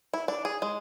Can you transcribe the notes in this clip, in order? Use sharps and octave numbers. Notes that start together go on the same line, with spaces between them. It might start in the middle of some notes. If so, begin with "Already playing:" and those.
E4
D4
G#4
G#3